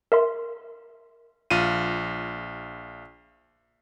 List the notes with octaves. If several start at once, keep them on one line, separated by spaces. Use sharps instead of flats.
A#4 E5 C6
A#1 F4 D#7